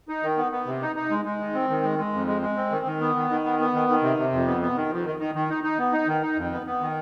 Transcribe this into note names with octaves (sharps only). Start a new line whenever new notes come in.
D#4
D#3
B3
B3
C3
D#4
D#4
G#3
G#3
D#3
C4
D#3
G#3
G#3
F2
G#3
G#3
C4
D#3
D#3
B3
D#3
D#3
B3
B3
D#3
D#3
C3
C3
F2
B3
B3
D#3
F2
D#3
D#3
D#3
D#4
D#4
B3
D#4
D#3
D#4
F2
B3
B3
D#3